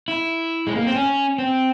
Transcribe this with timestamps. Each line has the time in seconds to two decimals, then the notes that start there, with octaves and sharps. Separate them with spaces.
0.08 E4
0.67 G#3
0.75 A#3
0.86 C4
0.95 C#4
1.38 C4